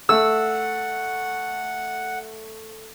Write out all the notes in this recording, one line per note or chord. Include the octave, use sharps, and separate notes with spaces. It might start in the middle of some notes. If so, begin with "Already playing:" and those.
A3 F#5 E6